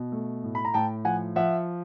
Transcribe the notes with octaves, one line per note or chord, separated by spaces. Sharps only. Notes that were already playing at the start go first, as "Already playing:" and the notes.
Already playing: B2
A3
A2
B5
A#5
A2 G5 A5
F3 F#5 G#5
F3 E5 F#5